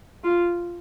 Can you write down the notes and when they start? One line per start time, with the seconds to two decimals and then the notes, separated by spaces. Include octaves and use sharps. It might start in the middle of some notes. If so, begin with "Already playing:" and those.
0.24 F4